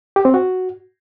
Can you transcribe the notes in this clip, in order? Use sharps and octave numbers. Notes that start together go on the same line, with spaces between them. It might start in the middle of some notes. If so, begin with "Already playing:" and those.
G4
C4
F#4